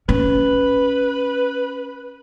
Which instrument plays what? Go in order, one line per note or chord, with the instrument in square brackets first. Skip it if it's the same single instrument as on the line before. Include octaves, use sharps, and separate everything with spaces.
[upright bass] C#4 [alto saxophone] B4